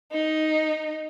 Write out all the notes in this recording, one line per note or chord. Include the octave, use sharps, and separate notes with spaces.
D#4